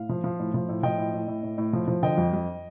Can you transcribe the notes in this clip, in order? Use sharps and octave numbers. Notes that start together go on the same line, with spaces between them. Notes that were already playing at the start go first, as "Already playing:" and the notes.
Already playing: A2 F5
F3
F3
A2
F3
A2
F3 D#5 G5
A2
A2
A2
A2
A2
F3
F3
D3 D#5 G5
F2
F2